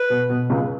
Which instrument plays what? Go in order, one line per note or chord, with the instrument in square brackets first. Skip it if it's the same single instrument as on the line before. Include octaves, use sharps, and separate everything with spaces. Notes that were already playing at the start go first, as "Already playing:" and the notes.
Already playing: [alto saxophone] B4
[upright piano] B2
B2
C#2 C#3